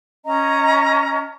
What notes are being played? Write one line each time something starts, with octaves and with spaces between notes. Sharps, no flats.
C#4 D#5 A#5